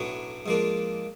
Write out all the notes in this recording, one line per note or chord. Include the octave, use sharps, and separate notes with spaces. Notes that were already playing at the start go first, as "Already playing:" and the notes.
Already playing: B1 A2 F#3 B3 D4
G#2 F3 A#3 D4